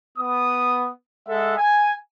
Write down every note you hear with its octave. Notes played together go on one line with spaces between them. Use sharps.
B3 D#6
G#3 A4 E5 F#5
G#5